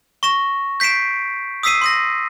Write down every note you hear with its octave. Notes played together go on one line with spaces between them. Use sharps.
C#6 A#6 E7
G6 B6 C7 D7 E7
D#6 E6 B6 C7 D#7
C6 D#6 A#6